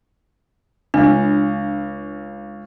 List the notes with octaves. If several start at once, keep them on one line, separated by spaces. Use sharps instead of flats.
C#2 D4